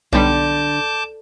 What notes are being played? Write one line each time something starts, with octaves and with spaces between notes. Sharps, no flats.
B1 D3 G3 A5 D6 G6